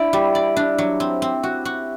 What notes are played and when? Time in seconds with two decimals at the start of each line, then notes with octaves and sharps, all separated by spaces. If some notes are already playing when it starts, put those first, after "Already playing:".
Already playing: D4 E4 D5
0.13 G3 G4
0.35 D5
0.57 D4
0.78 F#3
1.00 C4
1.22 C4
1.43 F#4
1.65 F#4